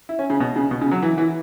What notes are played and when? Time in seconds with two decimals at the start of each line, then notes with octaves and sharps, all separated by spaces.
0.09 E4
0.19 C#4
0.30 C#3
0.40 B2
0.56 C#3
0.71 B2
0.81 C#3
0.91 F#3
1.02 E3
1.18 E3